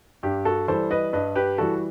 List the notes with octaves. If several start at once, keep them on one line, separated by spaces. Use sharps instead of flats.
G2 G4
F#4 A4
E3 G3 A4 C5
B4 D#5
G2 B4 D#5
G4 B4
E3 G3 F#4 A4